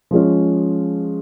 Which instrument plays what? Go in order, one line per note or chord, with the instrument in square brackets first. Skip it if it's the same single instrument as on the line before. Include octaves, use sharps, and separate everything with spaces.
[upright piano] F3 G#3 C#4